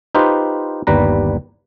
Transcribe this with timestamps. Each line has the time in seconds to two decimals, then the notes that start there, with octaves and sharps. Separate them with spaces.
0.15 D#4 F4 G4 B4 C5
0.87 G1 D#2 G3 B4 A#5